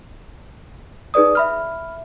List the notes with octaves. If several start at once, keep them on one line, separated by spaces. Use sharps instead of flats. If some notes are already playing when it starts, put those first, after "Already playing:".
D#4 G#4 B4 D5 D#6
E5 B5 F6